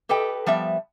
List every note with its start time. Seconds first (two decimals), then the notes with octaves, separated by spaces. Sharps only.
0.09 G4 A4 B4 D#5 G5
0.46 F3 G3 B3 E5